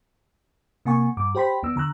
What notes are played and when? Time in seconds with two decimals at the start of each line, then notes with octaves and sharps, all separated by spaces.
0.85 C3 A#3 F#5 G#5 C#6
1.17 G2 D6
1.35 G4 C5 G5 B5 C6 B6
1.63 D#2 B3 E6
1.76 D3 A#5 E6 F#6